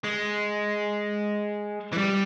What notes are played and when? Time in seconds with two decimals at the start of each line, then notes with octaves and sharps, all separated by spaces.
0.04 G#3
1.93 E3
1.98 G3